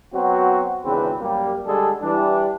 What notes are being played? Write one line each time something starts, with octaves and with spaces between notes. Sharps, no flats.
F#3 B3 C4 F#4
G#1 E2 C#3 C4 D4 B4
F#2 G3 A#3
D3 G3 G#3 D4 G#4 A4
E3 G3 D4